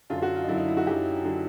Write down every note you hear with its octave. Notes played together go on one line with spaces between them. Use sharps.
F#2 D3 F#3 F4
F#4
F4
D#4
F#2 D3 F#3 E4
D#4
E4
F#4
F#2 D3 F#3 G4
D3 F#3